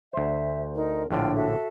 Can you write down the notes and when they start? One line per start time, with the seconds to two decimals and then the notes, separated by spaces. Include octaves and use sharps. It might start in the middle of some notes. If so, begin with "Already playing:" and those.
0.13 D2 C5 E5
0.75 D#4 A#4
1.10 A#1 A2 D3 D4 F4 G5
1.33 F#4 A4 E5